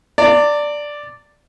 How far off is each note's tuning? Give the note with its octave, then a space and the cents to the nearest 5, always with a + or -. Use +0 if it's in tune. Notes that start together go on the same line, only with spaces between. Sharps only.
D5 +0 A#5 -45